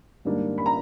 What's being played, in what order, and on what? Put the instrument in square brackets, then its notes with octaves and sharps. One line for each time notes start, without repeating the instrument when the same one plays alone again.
[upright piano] G#2 D#3 G3 A#3 D4
B5
A#5